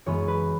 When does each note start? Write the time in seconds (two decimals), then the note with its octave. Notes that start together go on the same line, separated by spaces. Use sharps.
0.06 F#2 E3 G#3 B3 C#5
0.28 B4